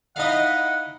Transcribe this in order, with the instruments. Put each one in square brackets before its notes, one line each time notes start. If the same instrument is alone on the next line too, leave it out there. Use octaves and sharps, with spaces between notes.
[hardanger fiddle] D#4 E4 [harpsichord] D#5 F5 [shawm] F#5